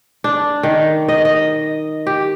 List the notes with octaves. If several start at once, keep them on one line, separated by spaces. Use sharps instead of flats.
D4
D#3
D#5
D#5
G4